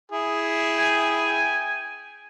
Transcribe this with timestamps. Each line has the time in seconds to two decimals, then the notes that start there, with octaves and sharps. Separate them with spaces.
0.12 E4 G#4
0.76 G5 G#5